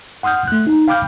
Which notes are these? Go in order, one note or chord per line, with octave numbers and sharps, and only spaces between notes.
F#5 C6 D#6 F6 G6
A3 F#6
D#4
F5 G5 B5 D6 F6 G6